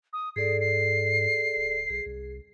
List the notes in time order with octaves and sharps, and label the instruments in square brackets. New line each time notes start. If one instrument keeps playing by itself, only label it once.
[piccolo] D#6
[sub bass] G#2 [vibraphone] G#4 A4 D5 [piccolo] C7
[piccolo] C7
[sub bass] D1
[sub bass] B1 [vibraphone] G#4
[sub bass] C2